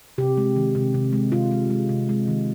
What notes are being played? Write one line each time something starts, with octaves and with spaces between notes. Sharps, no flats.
C3 G4
G#3
D#3
C3
C3
G#3
C3 F4
G#3
G#3
C3
G#3
D#3